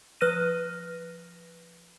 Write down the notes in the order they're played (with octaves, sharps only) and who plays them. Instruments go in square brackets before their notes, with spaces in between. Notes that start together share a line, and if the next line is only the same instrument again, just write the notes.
[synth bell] F3 B4 F6 F#6 A#6 D#7